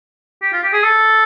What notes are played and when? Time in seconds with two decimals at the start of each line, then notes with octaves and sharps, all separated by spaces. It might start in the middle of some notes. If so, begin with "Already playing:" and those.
0.42 G4
0.52 F4
0.63 G4
0.73 G#4
0.83 A4